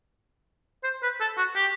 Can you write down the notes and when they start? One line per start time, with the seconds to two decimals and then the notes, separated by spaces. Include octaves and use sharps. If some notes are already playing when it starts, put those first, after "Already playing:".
0.83 C5
1.02 B4
1.20 A4
1.37 F#4
1.55 G4